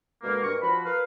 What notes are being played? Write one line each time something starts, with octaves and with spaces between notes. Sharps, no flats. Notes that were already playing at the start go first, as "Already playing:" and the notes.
B2 D3 G#3 A#3
G2 A#4 C#6
F3 F#4 B5
A#4 B4 F5